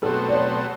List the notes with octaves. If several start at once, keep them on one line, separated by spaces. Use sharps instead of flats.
B2 F#3 A3 C4 A4
D5
C#5